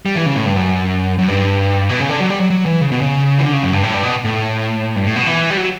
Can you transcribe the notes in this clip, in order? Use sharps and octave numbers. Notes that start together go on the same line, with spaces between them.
G3
E3
C#3
A2
G2
F#2
F#2
G2
B2
C#3
D3
F#3
G3
F#3
F#3
E3
C#3
B2
C#3
E3
D3
C#3
F#2
G2
A2
G2
B2
A2
G2
A2
B2
E3
G3
F#3